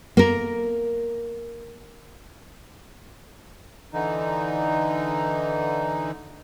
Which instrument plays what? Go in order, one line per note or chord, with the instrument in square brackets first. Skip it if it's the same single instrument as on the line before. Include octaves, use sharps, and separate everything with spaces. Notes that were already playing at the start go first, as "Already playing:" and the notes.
[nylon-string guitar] A#3 A#4
[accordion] D3 E3 D#4